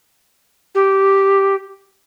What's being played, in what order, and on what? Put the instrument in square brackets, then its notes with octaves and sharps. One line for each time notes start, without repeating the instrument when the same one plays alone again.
[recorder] G4